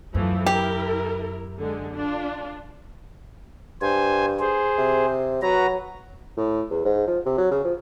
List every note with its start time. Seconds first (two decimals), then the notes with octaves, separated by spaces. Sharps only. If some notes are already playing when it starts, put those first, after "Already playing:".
0.15 F#2 E3 F3 A3
0.46 E4 G4 A#4
1.58 D3 G#3
1.94 D4 F4
3.81 G2 C5 G#5
4.39 G#4 C5
4.78 C3
5.42 F#3 F#4 B4 A#5
6.37 A2
6.70 E2
6.85 G#2
7.07 F3
7.26 C3
7.38 F#3
7.51 C#3
7.64 F3